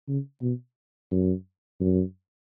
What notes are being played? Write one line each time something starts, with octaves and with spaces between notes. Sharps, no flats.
C#3
B2
F#2
F#2